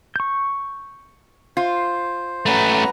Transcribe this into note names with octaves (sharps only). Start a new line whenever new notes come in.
C#6 G6
F4 C5
F#3 A3 C#4 B4 A#5